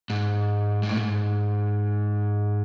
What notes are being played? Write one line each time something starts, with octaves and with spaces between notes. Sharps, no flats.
G#2
G#2
A2
G#2